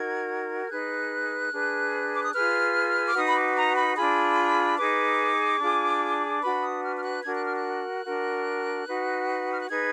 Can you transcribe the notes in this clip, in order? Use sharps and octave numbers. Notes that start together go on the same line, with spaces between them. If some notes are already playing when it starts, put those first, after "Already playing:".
Already playing: D#4 F#4 A#4 G#6
F6
D#4 G#4 B4 F#6
D4 G#4 B4
D6
D#6
F4 G#4 B4 F6
D6
D#4 F#4 B4 D#6
B5
D6
A#5
B5
D4 F4 G#4 B5
D#4 G#4 B4 D6
D4 F4 G#4
D4 F#4 B4 B5
D#6
F6
F6
F#6
D4 F#4 A#4 G#6
F#6
F6
F#6
D4 F#4 A#4
D#4 F#4 B4
F6
F#6
D#4 G#4 B4 G#6